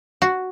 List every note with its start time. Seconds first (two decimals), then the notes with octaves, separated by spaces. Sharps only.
0.22 F#4